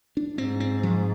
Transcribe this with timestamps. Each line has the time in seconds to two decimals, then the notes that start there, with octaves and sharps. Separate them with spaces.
0.17 D4
0.38 G#2 C4
0.60 C4
0.83 F3